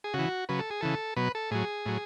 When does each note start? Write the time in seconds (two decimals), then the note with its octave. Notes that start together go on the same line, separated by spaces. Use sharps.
0.04 G#4
0.14 C#3 F#4
0.19 E3
0.49 C#3 F#3 B4
0.59 A4
0.70 G#4
0.81 C#3 E3 A4
1.17 B2 F#3 B4
1.35 A4
1.51 A2 F#3 G#4
1.86 A2 F#3